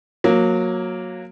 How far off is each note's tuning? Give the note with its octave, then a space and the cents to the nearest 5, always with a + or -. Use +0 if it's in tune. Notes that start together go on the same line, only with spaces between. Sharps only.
F#3 -20 A#3 +0